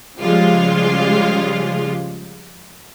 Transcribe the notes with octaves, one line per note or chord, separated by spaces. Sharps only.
C#3 F3 G3 G#3 F4